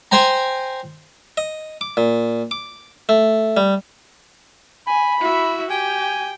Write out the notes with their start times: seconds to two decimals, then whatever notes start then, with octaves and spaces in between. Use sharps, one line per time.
0.12 C5 G5 G#5 A#5
1.37 D#5
1.81 D6
1.97 A#2
2.51 D6
3.09 A3
3.57 G3
4.87 G#5 B5
5.20 E4 F#4 E5
5.70 G4 G5 G#5